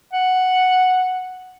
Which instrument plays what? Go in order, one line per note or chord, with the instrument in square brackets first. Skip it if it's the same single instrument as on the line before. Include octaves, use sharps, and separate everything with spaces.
[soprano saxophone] F#5